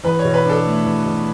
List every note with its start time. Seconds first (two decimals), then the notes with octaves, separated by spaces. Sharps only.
0.04 E2 B4
0.19 C#5
0.24 B2
0.34 B4
0.45 D4 A4
0.64 A3
0.85 E2
1.05 B2